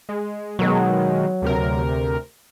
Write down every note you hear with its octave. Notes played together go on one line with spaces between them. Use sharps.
G#3
B2 D#3 F#3 G#3
D2 C3 A#4